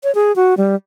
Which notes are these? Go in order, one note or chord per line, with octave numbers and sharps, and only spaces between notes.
C#5
G#4
F#4
G3